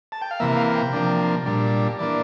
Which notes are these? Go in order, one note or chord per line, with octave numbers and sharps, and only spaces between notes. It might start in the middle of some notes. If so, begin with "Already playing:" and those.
A5
G5
F5
C3 E3 A#3 E5
F5
G5
C3 F3 A#3 D4
A#2 G3 D4
E3 A#3 D4 D5